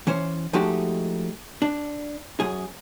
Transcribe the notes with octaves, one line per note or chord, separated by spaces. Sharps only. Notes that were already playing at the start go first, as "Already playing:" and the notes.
E3 C#4 C5
F3 G#3 A3 D#4 F#4 G4
D4
F#2 G#4